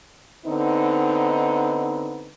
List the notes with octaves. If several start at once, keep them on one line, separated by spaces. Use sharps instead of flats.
D3 B3 C4 D#4